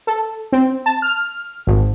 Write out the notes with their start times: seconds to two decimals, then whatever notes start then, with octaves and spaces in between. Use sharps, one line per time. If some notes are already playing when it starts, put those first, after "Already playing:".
0.07 A4
0.52 C4
0.86 A5
1.02 F6
1.67 G#1